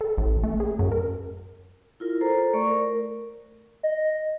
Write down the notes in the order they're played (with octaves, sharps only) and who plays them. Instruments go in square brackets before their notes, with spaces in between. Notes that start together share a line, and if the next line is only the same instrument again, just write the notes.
[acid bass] A4
A1
A3
G#4
F#2
A#4
[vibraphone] E4 F4 A#4
A4 C5 A#5
A3 D5 C#6
A#4
[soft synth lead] D#5